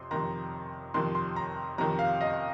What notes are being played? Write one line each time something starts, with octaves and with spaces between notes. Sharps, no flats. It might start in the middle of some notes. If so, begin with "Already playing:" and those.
Already playing: F2 C3 C6
F2 C3 D#3 A#5
F2 C3 D#3 C6
C6
A#5
F2 C3 D#3 A#5
F5
D#5